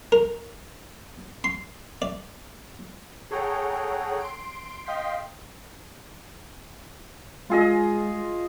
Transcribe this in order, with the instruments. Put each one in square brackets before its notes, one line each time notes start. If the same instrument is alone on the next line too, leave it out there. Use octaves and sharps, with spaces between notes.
[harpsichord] A#4
C6
D5
[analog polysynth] G#4 A4 C#5 F#5 G5 A#5
C6 D7
D#5 F5 G5 C6 G6 B6
[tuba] G#3 [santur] F4 G#4 D#5